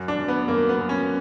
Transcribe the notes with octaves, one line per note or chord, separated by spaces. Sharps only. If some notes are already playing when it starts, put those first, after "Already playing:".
Already playing: F#2
D4
F#2
B3
F#2 A#3
B3
F#2
C#4